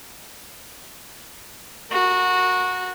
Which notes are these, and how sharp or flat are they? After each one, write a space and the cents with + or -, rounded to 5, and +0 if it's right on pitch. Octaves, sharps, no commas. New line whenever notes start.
F#4 -20 A#4 -15